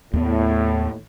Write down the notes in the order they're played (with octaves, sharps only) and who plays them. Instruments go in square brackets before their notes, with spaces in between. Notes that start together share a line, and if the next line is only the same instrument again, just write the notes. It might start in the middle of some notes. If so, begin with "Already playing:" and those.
[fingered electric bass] D#2 B3 [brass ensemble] A2